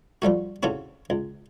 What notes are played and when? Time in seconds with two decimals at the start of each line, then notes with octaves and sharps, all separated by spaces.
0.22 F3 G3 A3 F#4
0.63 C#3 A3 C4 E4 F#4
1.10 C#2